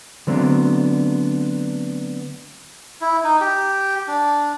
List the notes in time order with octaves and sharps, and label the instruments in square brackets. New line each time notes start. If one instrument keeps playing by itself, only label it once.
[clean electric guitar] D3 F#3 A3 B3 C4 D4
[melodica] E4
D#4
G4
D4